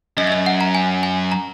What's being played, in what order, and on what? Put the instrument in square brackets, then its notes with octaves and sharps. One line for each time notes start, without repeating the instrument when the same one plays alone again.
[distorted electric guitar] F#2 [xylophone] D#5
[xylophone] E5
D#5
F#5
A#5
G#5
G#5
A#5